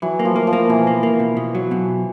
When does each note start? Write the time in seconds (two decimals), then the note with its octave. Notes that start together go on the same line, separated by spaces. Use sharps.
0.02 E3 F#3
0.19 A#3
0.25 F3
0.36 A#3
0.47 F3
0.53 A#3
0.69 B2 E3
0.87 A#3
1.03 A#3
1.20 B2
1.37 B2
1.55 F#3
1.71 B2